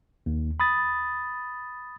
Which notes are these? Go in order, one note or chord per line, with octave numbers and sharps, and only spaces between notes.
D#2
B5 D#6 A6